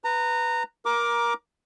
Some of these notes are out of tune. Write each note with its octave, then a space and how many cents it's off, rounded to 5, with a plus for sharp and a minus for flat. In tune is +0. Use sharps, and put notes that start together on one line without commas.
B4 +0 A#5 -20
A#4 +20 A#5 +15 D6 +0